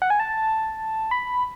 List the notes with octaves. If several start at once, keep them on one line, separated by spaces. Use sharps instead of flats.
F#5
G#5
A5
B5